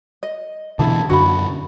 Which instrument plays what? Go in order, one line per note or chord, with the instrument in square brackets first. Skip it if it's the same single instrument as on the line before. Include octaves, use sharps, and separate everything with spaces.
[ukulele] D#5
[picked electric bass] B2 D3 E3 [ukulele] E4 G#4 A5
[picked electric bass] F#2 D3 [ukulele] F#4 B5